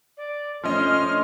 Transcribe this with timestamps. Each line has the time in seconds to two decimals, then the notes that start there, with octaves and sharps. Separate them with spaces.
0.17 D5
0.63 F3 A3 C#4 D4 D#5 C6 F6